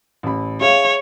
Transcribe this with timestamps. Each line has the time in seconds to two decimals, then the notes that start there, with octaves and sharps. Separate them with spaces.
0.23 A1 B5
0.61 G#4 C#5 E5 F5